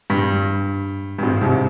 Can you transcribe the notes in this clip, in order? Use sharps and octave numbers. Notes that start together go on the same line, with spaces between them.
G2
G2
G#1 G#2
C2 C3